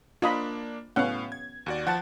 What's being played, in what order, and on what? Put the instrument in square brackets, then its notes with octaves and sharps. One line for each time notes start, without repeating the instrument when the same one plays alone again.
[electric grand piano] A#3 D4 [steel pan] F4 D#5 B5
[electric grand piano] A2 F5 [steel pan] B3 C#4 F#5
[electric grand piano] G#6
D#2 F#4 D5
[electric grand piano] F3 [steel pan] F#5 A5